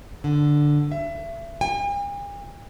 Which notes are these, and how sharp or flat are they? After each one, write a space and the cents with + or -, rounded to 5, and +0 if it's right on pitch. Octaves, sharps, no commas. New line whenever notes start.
D3 +5
E5 +30
G#5 -45